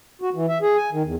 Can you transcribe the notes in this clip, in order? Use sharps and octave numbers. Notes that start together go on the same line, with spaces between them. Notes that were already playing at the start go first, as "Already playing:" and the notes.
F#4
E3
E5
G#4
G#5
D#3
E2